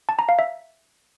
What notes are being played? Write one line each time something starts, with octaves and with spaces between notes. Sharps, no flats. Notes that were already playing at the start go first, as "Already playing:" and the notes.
A5
A#5
F5
E5